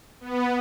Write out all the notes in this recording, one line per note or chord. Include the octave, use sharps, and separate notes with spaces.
B3